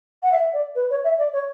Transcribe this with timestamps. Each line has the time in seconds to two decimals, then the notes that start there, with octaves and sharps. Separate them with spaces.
0.23 F#5
0.32 E5
0.53 D5
0.75 B4
0.90 C#5
1.04 E5
1.18 D5
1.33 C#5